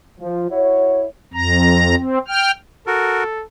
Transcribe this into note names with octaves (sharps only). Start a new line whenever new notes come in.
F3
E4 F#4 C#5
F2 A#5
C4
G5 F6
F#4 A4 A#4